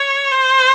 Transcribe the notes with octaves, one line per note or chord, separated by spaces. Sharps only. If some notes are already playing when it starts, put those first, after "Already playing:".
Already playing: C#5
C5